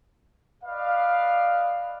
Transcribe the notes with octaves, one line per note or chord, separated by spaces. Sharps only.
B4 D5 D#5 F5